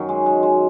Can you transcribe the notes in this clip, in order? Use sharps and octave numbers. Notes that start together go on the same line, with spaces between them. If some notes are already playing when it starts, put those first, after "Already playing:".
Already playing: F#2 D#3 F#3
G#3
G#3
G#3